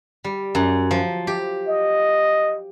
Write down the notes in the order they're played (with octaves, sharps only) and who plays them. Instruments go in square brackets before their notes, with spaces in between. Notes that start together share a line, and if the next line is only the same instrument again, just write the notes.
[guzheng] G3
F#2
F3
G4
[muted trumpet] D#5